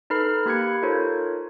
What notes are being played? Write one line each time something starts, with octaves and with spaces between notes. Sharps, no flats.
D#4 A4 B4 B5 F6 C7
A#3 G4 B5 F#6 G#6 C#7
D#4 F4 A4 A#4 C5 C#5